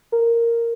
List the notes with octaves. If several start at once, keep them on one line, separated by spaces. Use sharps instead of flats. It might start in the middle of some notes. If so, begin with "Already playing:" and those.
A#4